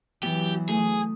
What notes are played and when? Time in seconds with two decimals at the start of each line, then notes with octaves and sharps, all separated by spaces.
0.23 E3 F#3 B3 G4
0.69 A3 G#4 D#6